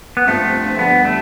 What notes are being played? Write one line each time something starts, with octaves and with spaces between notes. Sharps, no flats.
B3
G2 F3 A3 C4
F2 D3 G3 B3
A3